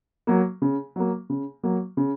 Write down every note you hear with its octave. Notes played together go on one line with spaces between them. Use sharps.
F#3 A#3
C#3
F#3 A#3
C#3
F#3 A#3
C#3